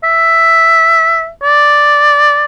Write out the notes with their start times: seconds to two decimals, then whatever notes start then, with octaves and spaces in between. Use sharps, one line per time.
0.04 E5
1.43 D5